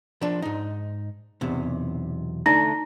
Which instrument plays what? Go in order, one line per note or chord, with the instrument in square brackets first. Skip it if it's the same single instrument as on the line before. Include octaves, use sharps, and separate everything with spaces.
[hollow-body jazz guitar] F3 D4
G#2 D#4
B1 E2 C3
[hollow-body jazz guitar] D2 A3 D4 [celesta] D#4 A#5 A#6